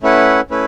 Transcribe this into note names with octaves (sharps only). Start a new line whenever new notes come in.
A3 C#4 E4 B4 F#5
A3 C#4 E4 B4